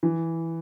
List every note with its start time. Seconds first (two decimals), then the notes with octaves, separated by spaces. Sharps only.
0.03 E3